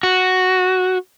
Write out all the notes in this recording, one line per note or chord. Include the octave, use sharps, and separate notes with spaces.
F#4